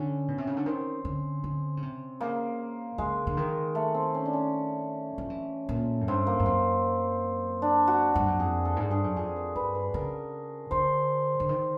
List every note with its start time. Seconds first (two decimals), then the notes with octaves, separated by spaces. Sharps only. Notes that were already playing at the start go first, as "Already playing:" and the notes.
Already playing: D3 C#4
0.28 B2
0.38 C3
0.47 C#3
0.57 D3
0.66 D#3 C4
1.05 D3
1.44 D3
1.77 C#3
1.82 C3
2.20 C#3 A#3
2.98 C#3 G#3
3.27 D3
3.37 D#3
3.75 A3
3.95 C4
4.15 C#4
4.26 D4
4.33 C#4
5.18 F3
5.30 E3
5.69 A#2
6.01 F#2
6.08 G2 C4
6.27 A#3
6.40 G2
6.46 F#2 C4
7.62 D4
7.88 F#4
8.14 G2 F#4
8.28 F#2
8.39 F2 G#4
8.65 A4
8.77 G#2
8.90 G2 G#4
9.04 F#2
9.16 F2 G#4
9.36 A#4
9.56 G2 B4
9.75 B4
9.94 C#3 A#4
10.71 D3 C5
11.40 D3
11.49 D#3